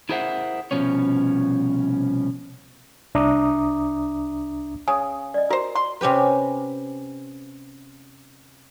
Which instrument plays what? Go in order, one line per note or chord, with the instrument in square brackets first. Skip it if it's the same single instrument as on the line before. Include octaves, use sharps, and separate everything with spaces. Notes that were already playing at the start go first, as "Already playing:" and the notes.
[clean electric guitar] E4 G#4 A#4 C5 E5 F#5
C2 B2 F3 C#4 C#5
[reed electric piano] C2 D4 E5 A#5 D6 D#6
[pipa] C#3 [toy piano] G#5 D#6
[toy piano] D5 D#5
[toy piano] F#4 [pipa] A#4 C5
[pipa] C6
[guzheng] C3 C#4 G4 B4